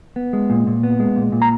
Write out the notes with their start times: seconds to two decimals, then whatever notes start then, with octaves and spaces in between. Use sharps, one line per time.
0.16 B3
0.33 G#3
0.50 A#2
0.67 A#2
0.83 B3
1.00 G#3
1.16 A#2
1.32 A#2
1.42 A#5